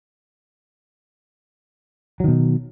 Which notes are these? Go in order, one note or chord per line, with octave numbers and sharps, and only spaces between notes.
B2 D#3 F#3